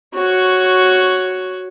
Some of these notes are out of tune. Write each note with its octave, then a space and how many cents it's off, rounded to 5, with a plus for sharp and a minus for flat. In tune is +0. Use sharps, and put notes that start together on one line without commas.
F#4 +0 C#5 +0